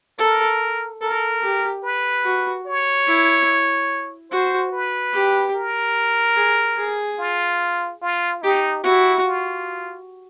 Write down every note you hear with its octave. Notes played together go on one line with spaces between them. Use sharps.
A4 A#4
A4 A#4
G4
B4
F#4
C#5
E4
F#4 C5
B4
G4
A#4
G#4
G#4
F4
F4
D#4 G4
E4 F#4
F4